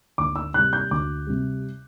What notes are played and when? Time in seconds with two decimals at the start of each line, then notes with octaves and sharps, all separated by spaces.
0.18 D2 D6
0.36 E6
0.54 C3 G3 F#6
0.73 G6
0.91 D2 D6
1.27 C3 G3